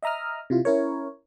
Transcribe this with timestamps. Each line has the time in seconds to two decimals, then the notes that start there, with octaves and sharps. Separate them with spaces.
0.03 D#5 E5 A#5 D#6 F6
0.50 C3 E4 F4
0.65 C#4 E4 A#4 C#5